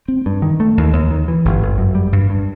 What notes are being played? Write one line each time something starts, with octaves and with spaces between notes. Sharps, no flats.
C4
G2
D#3
A3
D#2
D#2
D#3
E3
G1
G1
F#2
G3
G2
G2